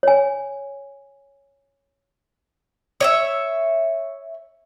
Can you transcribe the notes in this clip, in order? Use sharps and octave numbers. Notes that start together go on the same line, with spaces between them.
C#5 G#5
C#5 D#5 E5